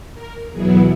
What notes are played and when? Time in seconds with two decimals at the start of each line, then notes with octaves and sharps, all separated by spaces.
0.14 A#4
0.50 E2 B2 F#3 B3 E4 G#4